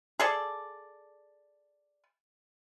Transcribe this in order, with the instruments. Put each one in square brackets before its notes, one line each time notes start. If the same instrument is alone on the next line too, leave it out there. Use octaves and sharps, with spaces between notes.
[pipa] G#4 A4 D5